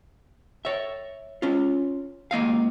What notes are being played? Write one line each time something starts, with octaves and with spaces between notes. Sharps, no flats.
C#5 E5
C#4 F4
C#2 A#3 D#5 F5